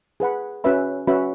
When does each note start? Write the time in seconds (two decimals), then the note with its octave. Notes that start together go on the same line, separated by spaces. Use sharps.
0.20 G#4 B4 F#5 B5
0.64 C#4 F#4 B4 E5 B5
1.07 C#4 F#4 B4 E5 B5